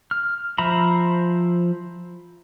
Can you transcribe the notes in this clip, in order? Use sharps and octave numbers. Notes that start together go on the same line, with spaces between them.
F6
F3 C5 E5 A#5 B5